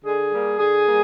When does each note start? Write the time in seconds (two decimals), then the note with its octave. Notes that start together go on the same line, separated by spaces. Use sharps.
0.05 D3 G#4
0.32 G3 A#3
0.59 D3 G#4
0.87 G3 A#3